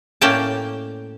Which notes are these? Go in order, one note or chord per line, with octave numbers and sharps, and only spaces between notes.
A2 A#3 C#4 D5 G5 A5